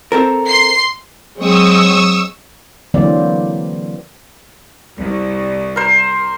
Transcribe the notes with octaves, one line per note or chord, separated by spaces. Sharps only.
C4 A4 A#4
C6 C7
F#3 G#3 C4 C#6 D#6 E6
D3 E3 F#3 A#3 C4 D5
C2
A#4 C5